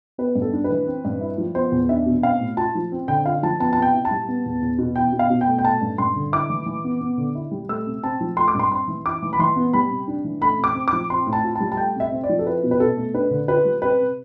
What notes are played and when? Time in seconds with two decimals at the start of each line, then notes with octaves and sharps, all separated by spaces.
0.18 B3 B4
0.35 G2
0.42 A4
0.53 D4
0.64 B4
0.70 E3
0.87 C4
1.05 G2
1.21 E4
1.38 F3
1.55 B3 C5
1.72 E2
1.89 D4 E5
2.06 B2
2.23 C4 F5
2.40 A2
2.57 F4 A5
2.75 F3
2.92 C4
3.08 D3 G5
3.26 F4 F5
3.43 F3 A5
3.60 B3 A5
3.73 A5
3.77 C3 G5
3.93 E4
4.05 A5
4.11 G3
4.28 B3
4.46 E2
4.63 E2
4.78 B2
4.96 E4 G5
5.13 B2
5.19 F5
5.30 B2
5.41 G5
5.47 A3
5.59 G5
5.64 A3 A5
5.81 G2
5.98 G2 C6
6.16 D3
6.32 E4 D6
6.50 E3
6.66 E3
6.84 B3
7.01 B3
7.18 D3
7.35 E4
7.51 G3
7.69 A3 E6
7.86 C3
8.03 C4 A5
8.21 F3
8.37 A3 C6
8.48 D6
8.55 G2 C6
8.71 C4 C6
8.88 E3
9.05 E4 D6
9.23 E3
9.33 B5
9.39 E3 C6
9.56 B3
9.73 G3 B5
9.90 C3
10.07 D4
10.24 E3
10.41 A3 B5
10.58 C3
10.64 D6
10.75 C4
10.88 F3 D6
11.10 C4 C6
11.26 A2
11.33 A5
11.44 F4
11.56 G3 A5
11.72 A5
11.77 A3 G5
11.96 C3 E5
12.12 C4
12.24 D5
12.29 F3
12.39 A4
12.45 E4 B4
12.63 B2
12.71 B4
12.80 B2 A4
12.97 A3
13.14 D4 B4
13.31 D3
13.48 F4 B4
13.65 G3
13.82 C4 B4
14.00 C3